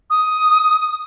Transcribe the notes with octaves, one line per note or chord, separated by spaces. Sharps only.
D#6